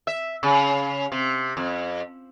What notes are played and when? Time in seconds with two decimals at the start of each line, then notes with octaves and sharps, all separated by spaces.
0.07 E5
0.43 C#3
1.12 C3
1.57 F2